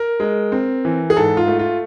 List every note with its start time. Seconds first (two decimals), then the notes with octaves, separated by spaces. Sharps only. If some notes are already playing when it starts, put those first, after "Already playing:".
Already playing: A#4
0.20 G#3
0.52 C4
0.85 E3
1.10 G#4
1.16 G#2 A4
1.37 F4
1.48 A3
1.59 F4